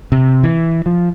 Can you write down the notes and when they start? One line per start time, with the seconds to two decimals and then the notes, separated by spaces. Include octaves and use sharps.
0.12 C3
0.43 E3
0.86 F3